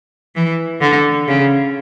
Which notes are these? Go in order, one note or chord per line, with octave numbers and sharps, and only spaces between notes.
E3
D3
C#3